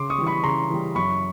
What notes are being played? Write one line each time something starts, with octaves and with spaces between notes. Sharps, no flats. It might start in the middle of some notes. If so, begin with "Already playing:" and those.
Already playing: C#3 C6 D6
C#6 D#6
E3 G3
B5 C#6
C#3 A#5 C6
E3 G3
F#2 B5 C#6